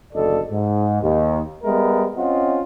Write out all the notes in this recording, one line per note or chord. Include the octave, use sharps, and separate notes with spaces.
F#1 D2 A4 D5 D#5
G#2
D#2
G3 G#3 B3 A#4 E5
C4 C#4 F4 D#5 F#5